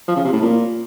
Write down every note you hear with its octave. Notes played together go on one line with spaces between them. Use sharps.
F3
C#3
C3
A2
A#2